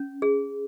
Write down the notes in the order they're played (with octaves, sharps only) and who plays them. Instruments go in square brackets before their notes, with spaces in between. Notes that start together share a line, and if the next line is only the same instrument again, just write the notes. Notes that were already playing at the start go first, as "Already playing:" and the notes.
Already playing: [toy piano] C#4
G#4